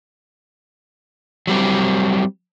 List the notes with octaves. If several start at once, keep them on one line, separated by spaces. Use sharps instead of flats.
F#3 G3 C4